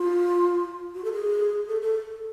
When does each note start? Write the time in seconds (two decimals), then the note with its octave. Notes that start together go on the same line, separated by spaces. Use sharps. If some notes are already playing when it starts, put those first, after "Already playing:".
Already playing: F4
0.95 F#4
1.04 A4
1.13 G#4
1.69 A4
1.82 A4